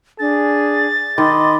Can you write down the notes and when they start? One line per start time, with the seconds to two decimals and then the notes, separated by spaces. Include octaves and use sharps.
0.19 D4 G#4 A6
1.18 D#3 D#5 B5 C6 D6